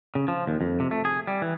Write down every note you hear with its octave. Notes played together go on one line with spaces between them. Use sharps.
C#3
F3
D#2
F2
C3
A3
G#4
G3
E3